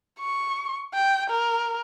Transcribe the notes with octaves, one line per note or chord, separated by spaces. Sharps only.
C#6
G5
A#4